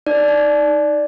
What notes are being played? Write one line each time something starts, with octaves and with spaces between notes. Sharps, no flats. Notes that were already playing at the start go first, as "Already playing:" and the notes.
D#4 D5
D#4